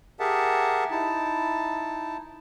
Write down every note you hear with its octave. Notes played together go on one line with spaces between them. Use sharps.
G4 G#4 A#4 E5 F#5 A5
D#4 E4 A5